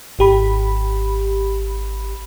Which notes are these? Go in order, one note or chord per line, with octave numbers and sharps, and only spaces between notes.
G#1 G4 B5